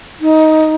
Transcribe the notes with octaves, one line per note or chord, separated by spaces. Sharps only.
D#4